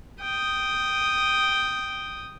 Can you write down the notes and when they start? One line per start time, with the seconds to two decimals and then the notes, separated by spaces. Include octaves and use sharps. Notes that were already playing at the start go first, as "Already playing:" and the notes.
0.21 G5 D#6